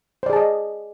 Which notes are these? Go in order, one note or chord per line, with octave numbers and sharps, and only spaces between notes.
G#4 C5 D5 D#5 A5